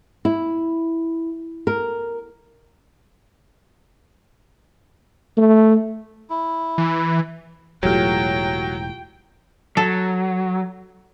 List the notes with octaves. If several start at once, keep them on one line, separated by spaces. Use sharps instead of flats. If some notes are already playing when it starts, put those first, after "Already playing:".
E4
A#4
A3
E4
E3
E1 A2 F#3 F4 G4 G5
F#3 A4